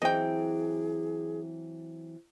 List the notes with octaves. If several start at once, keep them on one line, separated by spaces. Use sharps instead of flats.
E3 F#3 C4 G#4 D#5 G5